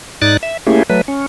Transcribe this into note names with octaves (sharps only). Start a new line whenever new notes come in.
G#2 D#4 D5 F#6 A6
E5
A3 A#3 C#4 E4 G4 G#4
F#3 A3 B4
C#4